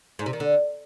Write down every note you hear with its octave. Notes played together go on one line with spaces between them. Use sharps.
G#2
C3
D#3
D3